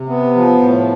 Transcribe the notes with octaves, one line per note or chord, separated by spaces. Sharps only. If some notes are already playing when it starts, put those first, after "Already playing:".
Already playing: C3
B3
F3
A2